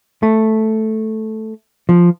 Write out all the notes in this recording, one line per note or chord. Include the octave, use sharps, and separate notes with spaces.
A3
F3